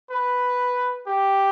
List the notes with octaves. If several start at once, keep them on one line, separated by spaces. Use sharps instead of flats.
B4
G4